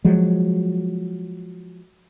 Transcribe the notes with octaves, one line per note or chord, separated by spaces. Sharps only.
F3 F#3 G#3